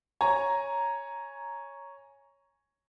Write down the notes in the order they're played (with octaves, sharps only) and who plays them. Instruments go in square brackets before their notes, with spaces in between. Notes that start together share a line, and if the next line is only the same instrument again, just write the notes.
[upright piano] C#5 G#5 A#5